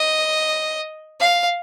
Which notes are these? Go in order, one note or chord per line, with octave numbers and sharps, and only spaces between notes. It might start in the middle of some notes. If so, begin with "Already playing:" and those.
Already playing: D#5
F5